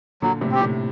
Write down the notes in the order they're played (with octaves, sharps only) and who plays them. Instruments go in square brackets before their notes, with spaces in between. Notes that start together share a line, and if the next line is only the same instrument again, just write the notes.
[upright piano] A#2 D3 [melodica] F#3
[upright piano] A2 C3
[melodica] C4 G4
[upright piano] A2 C3